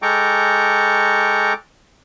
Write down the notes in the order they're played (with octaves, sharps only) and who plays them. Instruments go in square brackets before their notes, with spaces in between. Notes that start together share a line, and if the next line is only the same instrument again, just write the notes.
[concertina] G#3 A4 G5 A#5 C#6 D6